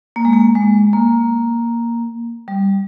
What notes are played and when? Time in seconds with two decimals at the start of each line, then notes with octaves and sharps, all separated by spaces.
0.16 A#3
0.25 G#3
0.33 A#3
0.55 G#3
0.93 A#3
2.48 G3